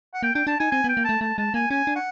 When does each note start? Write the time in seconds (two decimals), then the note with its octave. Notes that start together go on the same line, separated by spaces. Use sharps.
0.14 F#5
0.23 A#3 G5
0.35 D4 G5
0.47 D4 A5
0.60 D#4 G#5
0.71 C4 G#5
0.84 B3
0.89 G5
0.97 A#3
1.04 A3 A5
1.21 A3 A5
1.38 G#3 A5
1.54 A#3 G#5
1.70 C#4 G#5
1.87 D4
1.96 F#5